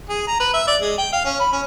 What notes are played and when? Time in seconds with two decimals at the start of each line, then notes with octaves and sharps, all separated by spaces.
0.09 G#4
0.27 A#5
0.40 B4
0.54 E5
0.67 D5
0.81 G#3
0.98 G5
1.13 F5
1.25 C#4
1.40 B5
1.53 C#4